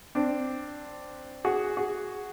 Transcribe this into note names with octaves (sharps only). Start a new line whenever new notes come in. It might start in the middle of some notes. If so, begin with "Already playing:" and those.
C4 D4
F#4 G#4
F#4 G#4